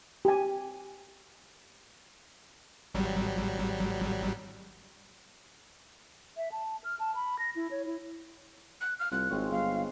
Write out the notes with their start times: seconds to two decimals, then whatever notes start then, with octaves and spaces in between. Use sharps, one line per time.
0.25 G4 G#5
2.95 G#1 F#3 G3
6.37 E5
6.52 A5
6.84 F6
6.99 A5
7.15 B5
7.39 A#6
7.55 E4
7.71 C#5
7.86 E4
8.81 F#6
8.99 F6
9.12 C2 F4 F#6
9.30 G#1 G#3 C4 C#5
9.52 G1 F5